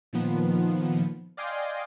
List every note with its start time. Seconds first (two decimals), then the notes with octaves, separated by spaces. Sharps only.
0.13 A#2 D#3 F3 B3
1.37 D5 D#5 F5 G5 G#5 C6